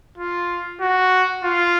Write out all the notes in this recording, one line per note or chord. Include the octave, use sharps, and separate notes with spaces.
F4
F#4
F4